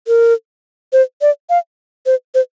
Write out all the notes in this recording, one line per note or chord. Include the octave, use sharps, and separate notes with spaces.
A#4
C5
D5
F5
C5
C5